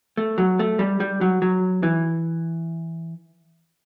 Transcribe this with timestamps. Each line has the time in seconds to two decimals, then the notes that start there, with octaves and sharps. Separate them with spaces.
0.17 A3
0.38 F#3
0.59 A3
0.79 G3
1.00 G3
1.21 F#3
1.42 F#3
1.83 E3